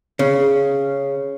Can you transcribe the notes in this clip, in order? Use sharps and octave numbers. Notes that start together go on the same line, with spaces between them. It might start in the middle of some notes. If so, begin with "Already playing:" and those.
C#3